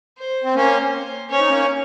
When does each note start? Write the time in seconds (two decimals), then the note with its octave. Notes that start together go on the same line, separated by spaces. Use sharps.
0.18 C5
0.43 C4
0.55 A#3 C#4 C5
1.30 C#4 C#5
1.40 D#4
1.49 A#3 C#4